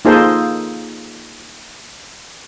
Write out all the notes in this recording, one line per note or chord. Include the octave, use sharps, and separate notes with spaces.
A#3 D#4 F4 G#4 A4 C5